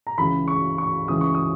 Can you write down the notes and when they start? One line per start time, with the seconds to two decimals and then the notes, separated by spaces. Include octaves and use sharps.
0.07 A#5
0.18 C#2 C#3 E3 B5
0.48 C#6
0.78 C#6
1.08 C#2 C#3 E3 D#6
1.21 C#6
1.34 D#6